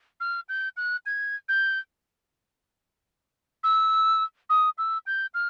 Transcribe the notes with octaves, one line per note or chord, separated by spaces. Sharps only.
F6
G6
F#6
G#6
G6
E6
D#6
E6
G6
F6